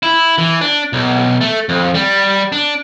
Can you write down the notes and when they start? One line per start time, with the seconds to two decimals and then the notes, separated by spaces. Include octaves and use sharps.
0.03 E4
0.38 E3
0.61 D4
0.93 B1
1.41 A3
1.69 F2
1.94 G3
2.52 D4